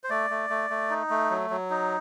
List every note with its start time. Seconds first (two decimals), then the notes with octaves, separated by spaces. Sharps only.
0.04 C5
0.10 A3 D5
0.30 A3
0.50 A3
0.70 A3
0.90 D#4
1.10 A3
1.30 F#3
1.50 F#3
1.70 D#4